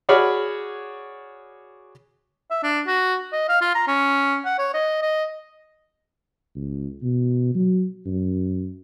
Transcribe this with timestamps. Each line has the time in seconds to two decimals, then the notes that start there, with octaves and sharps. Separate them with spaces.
0.09 F#4 G#4 C#5 D5 B5 F6
2.51 E5
2.63 D4
2.87 F#4
3.32 D#5
3.49 F5
3.61 F4
3.75 A#5
3.88 C#4
4.45 F#5
4.58 C#5
4.74 D#5
5.02 D#5
6.55 C#2
7.02 B2
7.55 F#3
8.06 F#2